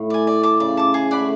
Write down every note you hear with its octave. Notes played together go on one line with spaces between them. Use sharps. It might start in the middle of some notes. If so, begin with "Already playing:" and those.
Already playing: A2
D5 G#5
D5
A5 D6
C#3 D5
A5 D6
G#4
D5 F#5 B5
A3